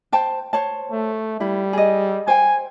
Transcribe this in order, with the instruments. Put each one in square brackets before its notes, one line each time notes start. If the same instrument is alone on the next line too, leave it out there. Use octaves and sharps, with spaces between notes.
[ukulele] C5 G5 A5
C5 C#5 A5
[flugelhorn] A3
[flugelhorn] G3 [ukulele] E4
[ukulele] G#4 D#5
[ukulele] C5 G5 [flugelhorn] G#5